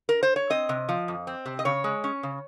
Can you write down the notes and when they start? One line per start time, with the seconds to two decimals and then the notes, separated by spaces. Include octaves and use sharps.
0.09 A#4
0.23 C5
0.36 C#5
0.50 C4 D#5
0.69 C3
0.89 F3
1.08 F2
1.27 C4
1.46 C3
1.59 D#5
1.65 C#3 C#5
1.84 G#3
2.04 C#4
2.23 C#3